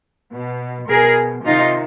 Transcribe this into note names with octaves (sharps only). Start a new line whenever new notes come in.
B2
B2 G#4 A#4
C3 D#3 D#4 F4